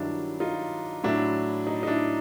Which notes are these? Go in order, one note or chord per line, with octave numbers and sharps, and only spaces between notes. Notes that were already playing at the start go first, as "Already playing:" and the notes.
Already playing: G2 D#3 F#3 D4 E4
D#4 F4
A2 F#3 D4 E4
D#4
D#4
D4 E4